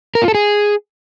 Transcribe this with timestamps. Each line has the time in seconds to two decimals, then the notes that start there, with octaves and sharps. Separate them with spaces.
0.15 A#4
0.22 F4
0.28 A4
0.35 G#4